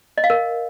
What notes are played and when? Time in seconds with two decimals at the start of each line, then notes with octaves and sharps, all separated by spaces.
0.18 D#5
0.24 F5
0.30 A#4